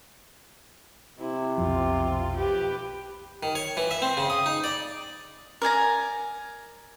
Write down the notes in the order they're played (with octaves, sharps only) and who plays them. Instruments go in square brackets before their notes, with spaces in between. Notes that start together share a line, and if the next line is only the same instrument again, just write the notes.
[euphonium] C3 [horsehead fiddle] E4
[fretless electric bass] B1 F2 F3 [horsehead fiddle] F4
[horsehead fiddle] G4 B4
[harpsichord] D#3
C#5
E3
E5
C4
C#3
D#6
D#4
D5
[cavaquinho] A#4 D5 G#5 A#5